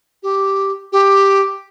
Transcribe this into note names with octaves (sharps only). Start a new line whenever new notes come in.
G4
G4